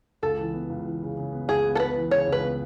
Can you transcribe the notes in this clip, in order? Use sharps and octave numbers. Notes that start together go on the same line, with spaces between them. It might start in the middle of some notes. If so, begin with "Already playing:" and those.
C#2 A4
E3
B3
C#2
E3
C#3
C#3
B3
C#2 G#4
B3
A4
B3 B4
E3
C#3 C#5
C#2
B4
B3